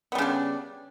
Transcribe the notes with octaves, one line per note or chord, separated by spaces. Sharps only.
C#3 G3 B3 D4